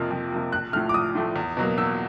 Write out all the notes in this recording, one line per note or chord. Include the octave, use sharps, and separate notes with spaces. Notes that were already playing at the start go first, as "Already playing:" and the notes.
Already playing: F2 C3 F3 A#3 F6
F2
C3 F3 A#3
A#1 F#6
A2 F3 A3 F6
D6
A#1 D#6
A2 F3 A3
E2
B2 F#3 A#3
E2 E6